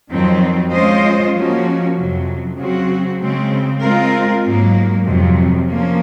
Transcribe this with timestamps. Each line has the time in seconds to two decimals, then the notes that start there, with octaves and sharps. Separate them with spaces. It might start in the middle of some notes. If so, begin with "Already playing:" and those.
0.11 F2 D#3 F#3 C4
0.73 G#3 C#4 F4 C5 D#5
1.35 F3 A#3 C#4 F#4
1.96 F2 C3 F#3
2.58 C#3 F#3 C4 F#4
3.21 C#3 G#3 C4
3.83 G#3 C4 F4 A#4
4.44 G#2 F#3 A#3
5.07 F2 C3 F#3
5.69 F3 A#3 C#4